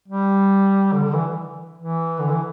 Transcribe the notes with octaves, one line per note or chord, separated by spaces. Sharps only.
G3
D3
D3
E3
E3
D3
E3